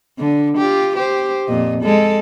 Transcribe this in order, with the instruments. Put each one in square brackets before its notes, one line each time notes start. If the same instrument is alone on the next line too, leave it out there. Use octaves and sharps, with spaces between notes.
[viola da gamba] D3
F4 G4
G4 C5
F2 A#2 D#5
G#3 A4